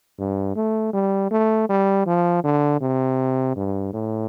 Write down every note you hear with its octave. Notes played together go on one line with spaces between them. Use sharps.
G2
A3
G3
A3
G3
F3
D3
C3
G2
A2